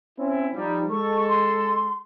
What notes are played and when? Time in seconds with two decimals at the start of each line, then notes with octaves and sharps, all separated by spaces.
0.19 C4 C#4 E4
0.54 F3 G3 D#4
0.90 G#3 A4 C#6
1.28 C6